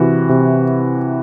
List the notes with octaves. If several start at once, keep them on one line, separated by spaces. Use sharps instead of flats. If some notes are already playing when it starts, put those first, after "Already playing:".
Already playing: C3 E3 F#4
C3